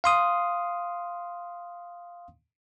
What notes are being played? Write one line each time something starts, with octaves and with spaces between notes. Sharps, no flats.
F5 C6 D#6